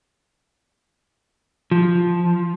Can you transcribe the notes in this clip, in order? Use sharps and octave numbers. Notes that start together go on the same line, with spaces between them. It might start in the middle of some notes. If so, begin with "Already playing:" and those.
F3